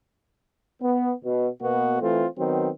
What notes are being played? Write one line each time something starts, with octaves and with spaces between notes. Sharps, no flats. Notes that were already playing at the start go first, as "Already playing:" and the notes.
B3
B2
B2 A#3 B3 F#4
E3 A3 C4 F4
D#3 F#3 B3 C4